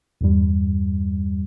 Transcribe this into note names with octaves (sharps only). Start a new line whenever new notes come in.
E2 G2 G3